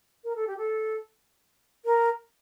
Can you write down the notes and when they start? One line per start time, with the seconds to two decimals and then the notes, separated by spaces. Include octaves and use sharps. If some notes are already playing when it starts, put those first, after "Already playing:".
0.24 A#4
0.36 A4
0.47 G4
0.57 A4
1.85 A#4